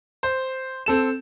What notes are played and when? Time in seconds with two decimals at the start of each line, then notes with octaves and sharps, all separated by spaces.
0.23 C5
0.86 C4 A4 E7